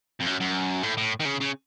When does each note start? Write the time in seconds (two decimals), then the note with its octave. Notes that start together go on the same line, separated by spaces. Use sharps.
0.21 F2
0.27 F#2
0.41 F#2
0.83 A2
0.98 A2
1.20 D#3
1.25 C#3
1.41 C#3